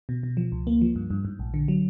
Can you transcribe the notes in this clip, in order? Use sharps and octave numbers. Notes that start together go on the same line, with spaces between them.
B2
B2
F3
C#2
A#3
F3
G2
G2
G#2
A#1
D3
F#3